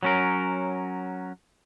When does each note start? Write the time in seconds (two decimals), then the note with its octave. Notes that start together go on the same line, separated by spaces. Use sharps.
0.03 F#3 C#4 A#4